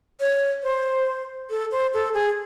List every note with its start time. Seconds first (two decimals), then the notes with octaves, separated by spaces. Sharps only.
0.20 C#5
0.63 C5
1.50 A4
1.72 C5
1.94 A4
2.14 G#4